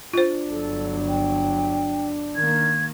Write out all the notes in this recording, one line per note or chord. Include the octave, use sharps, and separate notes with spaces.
D4 F4 C5
G1 F#3 A4
G5
D#3 A#3 G#6